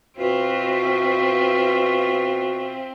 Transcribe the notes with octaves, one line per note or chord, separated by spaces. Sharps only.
B2 C4 F4 F#4 E5